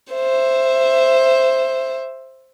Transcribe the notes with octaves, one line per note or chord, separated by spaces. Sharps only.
C5 E5